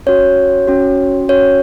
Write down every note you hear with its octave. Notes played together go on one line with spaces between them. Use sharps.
C#4 F#4 C#5
C#4 F#4
C#4 F#4 C#5